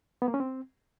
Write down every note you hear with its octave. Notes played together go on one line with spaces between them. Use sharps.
B3
A#3
C#4
C4